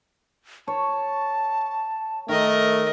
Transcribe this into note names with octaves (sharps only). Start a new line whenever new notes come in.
C#5 A5
D#3 A3 A#4 D#5